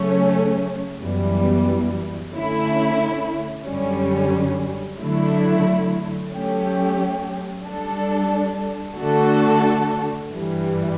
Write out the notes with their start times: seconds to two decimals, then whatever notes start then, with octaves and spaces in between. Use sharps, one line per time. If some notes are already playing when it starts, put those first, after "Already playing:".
Already playing: C#3 F#3 A3 C#4
1.01 F#2 E3 G3 B3
2.33 D3 A3 C#4 E4
3.66 F#2 D3 G3 C#4
4.99 D3 F#3 A3 E4
6.33 F#3 A3 C#4 G4
7.65 G3 D4 A4
8.98 D3 A3 D4 F#4 A4
10.31 G2 E3 G3